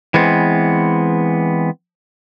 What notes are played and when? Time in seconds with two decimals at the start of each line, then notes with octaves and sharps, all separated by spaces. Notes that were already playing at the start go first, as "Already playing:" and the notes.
0.14 E3 G#3 B3 C4